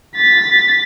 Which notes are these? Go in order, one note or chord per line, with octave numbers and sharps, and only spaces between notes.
A6 B6